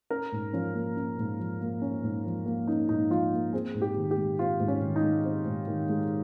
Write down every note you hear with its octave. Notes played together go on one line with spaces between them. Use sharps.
C#4 A#4
G#2
F3 C#4
A#3
C#4
G#2
F3
A#3
C#4
G#2
F3
A#3
C#4 D#4
G#2 D#4
F3 F4
A#3
C4 G#4
G#2
G4
D#3
G4
G#3
C4 F4
G#2
C#4
D#3
D#4
G#3
C4
G#2
D#3
G#3